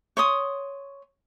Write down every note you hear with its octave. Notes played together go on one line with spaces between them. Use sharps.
C#5 C6 D#6